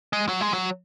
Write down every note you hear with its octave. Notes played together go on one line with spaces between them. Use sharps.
G#3
F#3
G#3
F#3